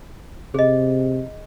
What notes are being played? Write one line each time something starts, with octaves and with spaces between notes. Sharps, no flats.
C3 G#4 D#5